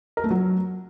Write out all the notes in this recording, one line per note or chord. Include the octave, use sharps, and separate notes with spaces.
A#4
A3
F#3